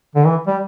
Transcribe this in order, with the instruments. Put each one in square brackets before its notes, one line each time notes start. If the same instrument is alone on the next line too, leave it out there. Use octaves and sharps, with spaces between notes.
[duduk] D3
E3
G3